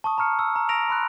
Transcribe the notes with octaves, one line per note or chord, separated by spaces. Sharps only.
A5 C#6 D#6
A#5 C#6 F6 C#7
E6
A#5
A#5 E6 A#6 D7 F7
B5 C6 F#6